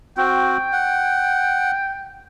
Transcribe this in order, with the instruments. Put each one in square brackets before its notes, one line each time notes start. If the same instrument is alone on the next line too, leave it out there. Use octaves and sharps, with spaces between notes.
[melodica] C4 F#4 [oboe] G5
[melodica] F#5